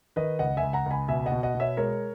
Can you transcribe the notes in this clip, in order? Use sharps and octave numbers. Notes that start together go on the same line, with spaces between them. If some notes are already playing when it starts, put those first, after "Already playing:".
D#3 B4 D#5
C#2 D#5 F#5
E5 G#5
C#2
F#5 A#5
C#2 G#5 B5
B2 E5 G#5
D#5 F#5
B2
D#5 F#5
B2
C#5 E5
G#3 A#4 C#5